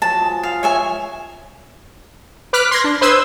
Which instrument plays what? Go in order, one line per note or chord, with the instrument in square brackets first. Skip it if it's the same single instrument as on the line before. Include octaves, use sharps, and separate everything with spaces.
[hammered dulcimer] F3 F#3 [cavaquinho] A5
[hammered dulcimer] G#3
[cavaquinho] F5
C#5 E5 G#5
[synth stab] B4 D6 F6 F#6 B6
C6 G#6 A#6
D4
B4 C5 C6 D#6 E6 G#6